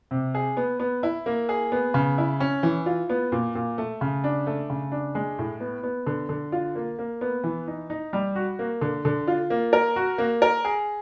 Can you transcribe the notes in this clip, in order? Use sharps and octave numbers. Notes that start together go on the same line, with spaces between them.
C3
G#4
B3
B3
E4
A#3
G#4
B3
C#3
E4
C#4
E3
F4
B3
A#2
A#2
A3
C#3
D4
A3
C#3
D4
G#3
A2
B3
B3
D3
D3
F4
A#3
A#3
B3
E3
D#4
D#4
G3
F#4
A#3
D3
D3
F4
A#3
A#4
F#4
A#3
A#4
G#4